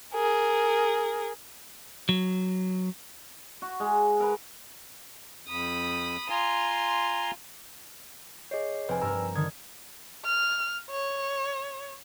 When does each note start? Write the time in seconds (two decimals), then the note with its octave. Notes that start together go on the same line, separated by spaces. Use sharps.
0.13 G#4 A#4
2.09 F#3
3.62 F#4
3.80 G#3
4.20 A#4 B4
5.47 F2 B5 D#6
6.30 F4 G#5 A#5 C6
8.51 G#4 C#5 D#5 C7
8.89 F1 C4 B4 G#5
9.02 G2 A#4 A#5 E6
9.36 D3 D#3 D#6 G#6
10.25 F6
10.91 C#5